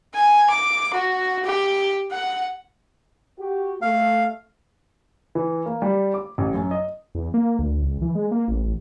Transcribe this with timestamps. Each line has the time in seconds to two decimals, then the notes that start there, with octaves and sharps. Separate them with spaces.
0.15 G#5
0.50 D6
0.93 F#4
1.45 G4
2.12 F#5
3.39 F#4 G4
3.82 A3 F5
5.35 E3
5.66 A#3
5.82 G3
6.14 D6
6.38 A1
6.54 F#2
6.71 D#5
7.15 E2
7.34 A#3
7.59 D2
7.82 C#2
8.02 E3
8.15 G#3
8.31 A#3
8.48 A1
8.64 A1